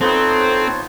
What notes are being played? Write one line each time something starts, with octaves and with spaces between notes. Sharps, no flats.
F3 B3 C4 D#4 A4 C5 C#5 A5